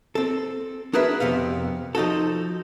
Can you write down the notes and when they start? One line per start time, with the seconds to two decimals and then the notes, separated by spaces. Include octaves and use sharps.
0.15 C4 A4
0.93 D4 F#4 G#4 A#4 B4 E5
1.20 F2 C3 B3 F5
1.95 F3 D#4 F#4 A4